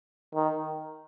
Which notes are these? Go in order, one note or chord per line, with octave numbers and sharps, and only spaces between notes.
D#3